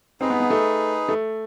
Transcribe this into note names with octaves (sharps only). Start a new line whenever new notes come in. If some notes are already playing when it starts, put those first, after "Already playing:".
C4 D#4 G#4 B4
B3
B3
A3
A3